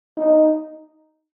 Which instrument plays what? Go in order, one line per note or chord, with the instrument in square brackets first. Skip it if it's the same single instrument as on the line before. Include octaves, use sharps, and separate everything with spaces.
[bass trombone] D#4